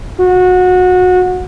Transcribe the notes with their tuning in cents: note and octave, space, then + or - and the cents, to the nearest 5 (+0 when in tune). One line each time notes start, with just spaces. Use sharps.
F#4 -25